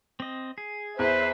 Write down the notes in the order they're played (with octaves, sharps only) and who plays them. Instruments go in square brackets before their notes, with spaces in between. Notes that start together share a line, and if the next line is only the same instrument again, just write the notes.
[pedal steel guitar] C4 D#5
G#4
[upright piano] E2 [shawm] B4 [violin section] C5 E5